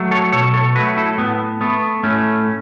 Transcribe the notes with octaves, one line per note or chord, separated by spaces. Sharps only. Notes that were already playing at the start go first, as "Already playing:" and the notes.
Already playing: F#3 A3
A4 C#5
B2 A4 C#5
A4 C#5
F#3 A3 F#4 B4
E4 A4
A2 B3
A3 B3
A2 A3 C#4